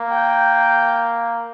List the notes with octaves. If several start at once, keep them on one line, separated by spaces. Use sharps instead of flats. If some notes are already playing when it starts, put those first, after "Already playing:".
Already playing: A#3
G5